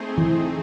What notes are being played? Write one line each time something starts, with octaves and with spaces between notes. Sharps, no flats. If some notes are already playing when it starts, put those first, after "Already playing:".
Already playing: A3 C4 D#4 G#4 C5
E3